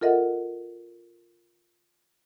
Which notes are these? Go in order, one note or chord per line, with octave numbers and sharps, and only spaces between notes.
F4 A4 A#4 D#5 E5 F#5